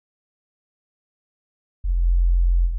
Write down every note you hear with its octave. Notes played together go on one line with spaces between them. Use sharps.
F1